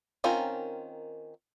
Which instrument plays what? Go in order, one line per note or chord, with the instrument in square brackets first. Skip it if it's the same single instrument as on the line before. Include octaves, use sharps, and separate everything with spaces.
[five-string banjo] D#3 C4 C#4 F4 A#4